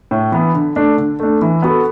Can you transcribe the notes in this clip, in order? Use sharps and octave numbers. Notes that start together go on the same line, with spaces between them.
A2
E3 B3
D3
A3 D4
D3
A3 D4
E3
B3 F#4 A4